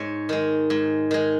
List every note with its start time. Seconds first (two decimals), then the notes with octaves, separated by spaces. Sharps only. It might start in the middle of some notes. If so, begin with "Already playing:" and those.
Already playing: G#2 C#5
0.29 D#3 G#3
0.70 G#2
1.11 D#3 G#3